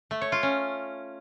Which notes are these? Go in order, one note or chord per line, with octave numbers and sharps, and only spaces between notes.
A3
C#5
F4
C#4